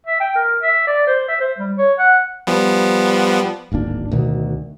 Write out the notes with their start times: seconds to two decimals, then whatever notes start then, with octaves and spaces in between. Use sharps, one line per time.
0.07 E5
0.20 G5
0.35 A#4
0.62 E5
0.87 D5
1.07 C5
1.28 E5
1.40 C5
1.58 G3
1.78 C#5
1.99 F#5
2.47 F3 G3 B3
3.72 D1 G#1 A#3 D4
4.12 D2 B2 D#3